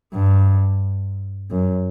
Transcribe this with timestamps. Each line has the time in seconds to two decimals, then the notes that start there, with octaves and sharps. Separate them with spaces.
0.14 G2
1.51 F#2